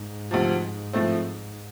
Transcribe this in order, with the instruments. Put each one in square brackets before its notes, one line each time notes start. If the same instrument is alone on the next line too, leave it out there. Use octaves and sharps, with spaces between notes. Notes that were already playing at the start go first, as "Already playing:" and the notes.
Already playing: [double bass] G#2
[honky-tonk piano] D2 C3 F3
A2 F3 A3 C4